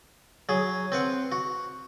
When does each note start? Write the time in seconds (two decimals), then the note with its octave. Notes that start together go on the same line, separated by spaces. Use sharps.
0.49 F#3 G#4
0.92 C4 B4 F#5
1.32 F#4